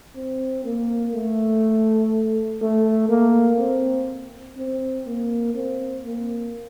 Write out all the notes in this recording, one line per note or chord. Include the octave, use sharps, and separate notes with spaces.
C4
A#3
A3
A3
A#3
C4
C4
A#3
C4
A#3